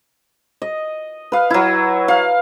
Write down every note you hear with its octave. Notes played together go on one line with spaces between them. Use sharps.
D#5
B4 F5
F#3 E4
F5